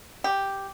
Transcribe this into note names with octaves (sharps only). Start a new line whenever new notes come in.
G4